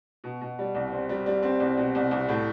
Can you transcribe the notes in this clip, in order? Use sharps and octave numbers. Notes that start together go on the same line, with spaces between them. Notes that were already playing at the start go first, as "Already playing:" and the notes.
B2
B2
G3
C2
C4
G3
G3
C4
C2
B2
C2
C2
A2